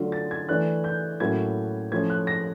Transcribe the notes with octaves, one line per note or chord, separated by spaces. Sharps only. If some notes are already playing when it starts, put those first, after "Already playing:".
Already playing: D3 F#3 A3 D4 F4
A6
G#6
E3 A3 D4 F#6
G6
A2 F#3 A#3 C#4 E4 G#6
F3 A3 C#4 E4 G#6
F#6
A#6